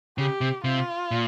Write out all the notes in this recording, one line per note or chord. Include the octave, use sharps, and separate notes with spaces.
C#3 G4
C3
C3 F4
A#2